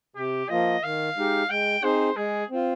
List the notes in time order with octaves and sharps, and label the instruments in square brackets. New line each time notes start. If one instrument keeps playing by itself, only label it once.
[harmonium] C3 [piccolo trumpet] G4
[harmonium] F3 A#3 F4 [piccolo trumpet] D#5
[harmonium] D#3 [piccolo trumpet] F5
[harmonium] G#3 D#4 G4
[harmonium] G#3 [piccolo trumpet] G5
[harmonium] C4 D#4 G#4 [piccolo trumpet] C5
[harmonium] G#3 [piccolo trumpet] G#4
[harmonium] C4 F4